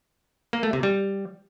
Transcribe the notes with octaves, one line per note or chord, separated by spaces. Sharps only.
A#3
A3
C3
G3